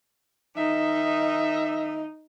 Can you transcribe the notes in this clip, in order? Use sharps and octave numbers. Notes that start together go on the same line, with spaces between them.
D#3 D#4 D#5 E5